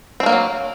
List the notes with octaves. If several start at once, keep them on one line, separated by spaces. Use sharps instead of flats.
D#3 F#3 A3 A#3 C4